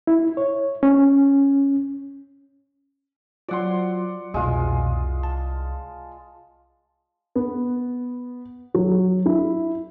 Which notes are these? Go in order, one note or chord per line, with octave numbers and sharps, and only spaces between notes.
E4
C#5
C#4
F#3 F4 D5 F#5 C6
C2 F2 B2 G#3 F4
A5
B3
F#3
E4